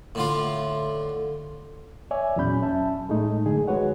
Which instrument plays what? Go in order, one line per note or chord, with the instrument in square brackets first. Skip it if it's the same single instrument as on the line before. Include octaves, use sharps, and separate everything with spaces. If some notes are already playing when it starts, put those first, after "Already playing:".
[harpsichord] A2 D3 F4
[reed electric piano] C#5 D5 E5 G#5
E2 A#2 F#3 C#4 B5 G6
C#4 E5 A5
A2 G#3 A3 D#4
F#2 D3 G#4
G#3 F#4 B4 C#5 F#5